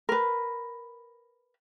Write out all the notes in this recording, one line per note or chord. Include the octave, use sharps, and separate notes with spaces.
A#4 B4